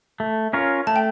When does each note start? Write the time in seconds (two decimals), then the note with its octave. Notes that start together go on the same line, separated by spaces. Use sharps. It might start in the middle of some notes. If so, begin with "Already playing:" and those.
0.20 A3
0.53 C#4 F4 A#4 C#5
0.87 A3 A5
0.96 G5